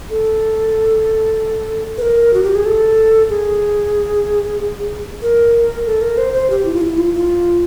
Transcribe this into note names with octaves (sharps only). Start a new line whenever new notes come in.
A4
B4
A#4
F#4
G4
G#4
A4
G#4
A#4
A4
A#4
C5
C5
G4
E4
F4
E4
F4
F4